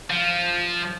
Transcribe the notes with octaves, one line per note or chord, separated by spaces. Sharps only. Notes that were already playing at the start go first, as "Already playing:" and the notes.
F3